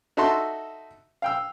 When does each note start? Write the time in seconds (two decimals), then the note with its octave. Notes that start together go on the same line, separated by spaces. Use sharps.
0.17 D#4 F#4 A4 E5 A5 C6
1.22 F5 G5 E6